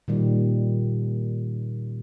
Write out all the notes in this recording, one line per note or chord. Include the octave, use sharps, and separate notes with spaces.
A#2 D#3 G3